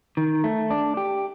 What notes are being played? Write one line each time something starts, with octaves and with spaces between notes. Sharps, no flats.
D#3
A3
D4
G4